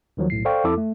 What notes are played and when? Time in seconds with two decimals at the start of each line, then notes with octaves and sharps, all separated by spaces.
0.17 D#2 D#3 F3 F#3
0.30 B1 A2 C7
0.45 A4 C5 D5 F5 G5 C#6
0.64 F2 E4 A4 D6
0.78 A3